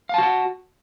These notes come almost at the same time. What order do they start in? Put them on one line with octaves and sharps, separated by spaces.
F5 A5 F#4 F#5